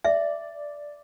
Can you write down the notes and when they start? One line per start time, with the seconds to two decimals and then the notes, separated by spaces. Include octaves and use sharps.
0.04 D5 E5